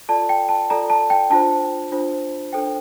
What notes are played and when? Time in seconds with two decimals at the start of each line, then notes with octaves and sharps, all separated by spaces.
0.09 F4 A4 D5 A5
0.29 G5
0.49 A5
0.70 F4 A4 D5 A#5
0.90 A5
1.10 G5
1.30 D4 F4 C5 A5
1.92 D4 F4 C5
2.53 D4 A4 C5 G5